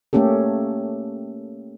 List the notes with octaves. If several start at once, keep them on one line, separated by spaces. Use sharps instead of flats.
A3 A#3 C#4 G4 A4